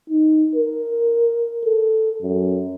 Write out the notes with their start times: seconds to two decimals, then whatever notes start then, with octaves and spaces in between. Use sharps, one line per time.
0.10 D#4
0.55 A#4
1.65 A4
2.22 F#2